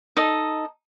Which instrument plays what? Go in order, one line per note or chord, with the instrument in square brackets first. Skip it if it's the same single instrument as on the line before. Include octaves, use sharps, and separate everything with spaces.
[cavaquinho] D#4 A4 D#5